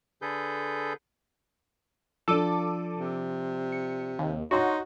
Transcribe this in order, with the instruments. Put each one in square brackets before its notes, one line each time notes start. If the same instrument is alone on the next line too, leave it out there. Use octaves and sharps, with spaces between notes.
[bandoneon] D3 G#4 A4 B4 G6
[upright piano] F3 D4 [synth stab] A4 D6 D#7
[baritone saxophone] C3
[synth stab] C#7
D#2
[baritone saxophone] D#4 [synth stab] F#4 [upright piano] C#5 C6 C#6